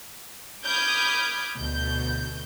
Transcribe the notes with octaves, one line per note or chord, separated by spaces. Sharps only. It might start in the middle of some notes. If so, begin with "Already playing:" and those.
B5 D6 D#6 F6 G6 G#6
D2 B2 G6